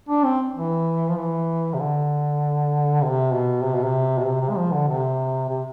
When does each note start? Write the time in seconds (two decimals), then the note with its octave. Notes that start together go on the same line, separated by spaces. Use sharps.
0.09 D4
0.24 C4
0.55 E3
1.09 F3
1.16 E3
1.74 C3
1.79 D3
3.02 C3
3.33 B2
3.64 C3
3.75 B2
3.84 C3
4.18 B2
4.26 C3
4.41 C3
4.49 G#3
4.58 F3
4.73 D3
4.88 C3
5.49 C3